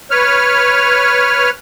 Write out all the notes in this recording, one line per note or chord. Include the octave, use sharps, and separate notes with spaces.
B4 C#5 F6